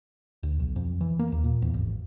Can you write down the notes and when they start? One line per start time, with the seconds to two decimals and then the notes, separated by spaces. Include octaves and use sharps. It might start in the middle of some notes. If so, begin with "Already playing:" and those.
0.43 D2
0.59 B1
0.76 F2
1.01 E3
1.19 A#3
1.32 D#2
1.44 A#2
1.62 E2
1.74 G#1